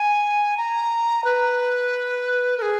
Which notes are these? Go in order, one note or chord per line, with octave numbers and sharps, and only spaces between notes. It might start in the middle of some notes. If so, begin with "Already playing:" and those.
Already playing: G#5
A#5
B4
A#4
G#4